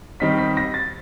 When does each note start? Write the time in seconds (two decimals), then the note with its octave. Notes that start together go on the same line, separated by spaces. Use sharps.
0.20 D#3 G3 C4 D#4 B6
0.38 B6
0.57 A#6
0.74 A6